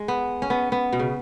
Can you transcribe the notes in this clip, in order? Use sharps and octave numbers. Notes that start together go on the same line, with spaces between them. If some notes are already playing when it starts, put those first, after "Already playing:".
Already playing: G#3
B3
C#4
B3
B3
B2
C#3